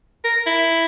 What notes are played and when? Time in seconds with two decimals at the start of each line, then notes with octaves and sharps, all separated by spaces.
0.24 A#4
0.46 E4